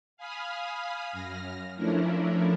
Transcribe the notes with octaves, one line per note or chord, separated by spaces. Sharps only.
F5 G#5 B5 D#6 F6
F#2 F6 A#6
F3 A3 C#4 D4 E4 A#4